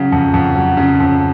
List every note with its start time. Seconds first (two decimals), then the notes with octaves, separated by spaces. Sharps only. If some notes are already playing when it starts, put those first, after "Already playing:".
Already playing: C#3 F#3
0.12 F2
0.34 F2
0.55 F#3
0.77 C#3
1.00 F2